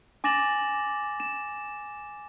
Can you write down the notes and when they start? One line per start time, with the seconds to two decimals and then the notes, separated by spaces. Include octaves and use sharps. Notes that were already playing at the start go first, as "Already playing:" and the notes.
0.24 G#5 D6 A6 A#6 E7 F#7
1.20 E7